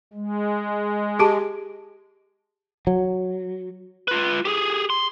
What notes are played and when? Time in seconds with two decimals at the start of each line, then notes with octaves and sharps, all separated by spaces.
0.13 G#3
1.19 G4 G#4 A5
2.87 F#3
4.08 F4 B4
4.45 G4 G#4
4.90 C6